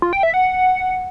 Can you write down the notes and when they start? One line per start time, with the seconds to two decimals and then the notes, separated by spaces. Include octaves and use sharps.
0.02 F4
0.13 G5
0.23 E5
0.34 F#5